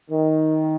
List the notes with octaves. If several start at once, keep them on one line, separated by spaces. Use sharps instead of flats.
D#3